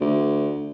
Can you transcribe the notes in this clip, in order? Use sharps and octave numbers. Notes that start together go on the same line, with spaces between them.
D2